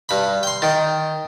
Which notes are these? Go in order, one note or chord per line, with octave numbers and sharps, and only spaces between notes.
G2 B5
G5 C6
D#3 D#5 G5 A6